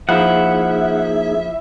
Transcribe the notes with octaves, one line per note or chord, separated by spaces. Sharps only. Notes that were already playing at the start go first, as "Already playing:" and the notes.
F3 A#3 D#4 E4 G#4 E5 F#5